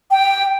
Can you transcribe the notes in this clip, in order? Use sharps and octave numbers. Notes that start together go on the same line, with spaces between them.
G5